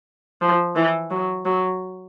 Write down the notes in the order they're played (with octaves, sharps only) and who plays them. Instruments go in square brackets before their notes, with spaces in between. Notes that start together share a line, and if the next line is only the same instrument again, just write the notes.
[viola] F3
E3
F#3
F#3